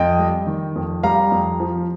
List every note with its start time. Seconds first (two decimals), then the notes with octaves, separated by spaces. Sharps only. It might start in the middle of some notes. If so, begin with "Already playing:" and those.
Already playing: F2 D#5 G5
0.19 G3
0.47 D#3
0.76 F2
1.03 G3 F5 A#5
1.32 F2
1.60 F3